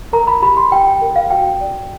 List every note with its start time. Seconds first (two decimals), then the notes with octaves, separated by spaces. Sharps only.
0.13 A#4 A#5
0.27 B5
0.42 G4 B5
0.57 C6
0.72 G4 G5
0.87 G5
1.02 A#4
1.16 F5
1.31 F#4 G5
1.61 D5